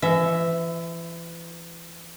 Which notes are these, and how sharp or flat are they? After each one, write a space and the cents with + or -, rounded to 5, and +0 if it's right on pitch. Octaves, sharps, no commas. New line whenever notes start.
E3 +35 E5 +0